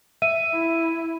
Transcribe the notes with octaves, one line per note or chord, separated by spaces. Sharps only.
E5 D#7
E4